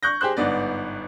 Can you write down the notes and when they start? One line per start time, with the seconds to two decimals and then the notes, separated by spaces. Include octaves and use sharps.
0.03 C#6 F#6 G6 A#6
0.21 G4 G#4 C5 F#6
0.37 G1 G#2 B3 D5